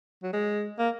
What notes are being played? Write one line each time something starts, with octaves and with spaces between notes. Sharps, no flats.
F#3
G#3
A#3